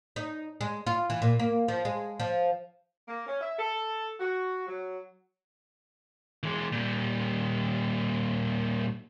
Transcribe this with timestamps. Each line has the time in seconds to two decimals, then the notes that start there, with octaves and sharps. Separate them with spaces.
0.16 D#4
0.61 G#3
0.87 F4
1.10 E3
1.22 A#2
1.40 A#3
1.68 F3
1.85 G#3
2.20 F3
3.07 A#3
3.27 C#4
3.41 E5
3.58 A4
4.20 F#4
4.67 F#3
6.43 E3 G#3
6.72 A#2 G3